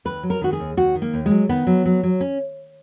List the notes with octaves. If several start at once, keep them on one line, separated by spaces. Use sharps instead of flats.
D#2 B4
F#3
A#4
D#3 F#4
G#4
D#2
D#2 F#4
D#3
A#3
D#2
G#3
F#3
D#3 B3
F#3
F#3
F#3
C#4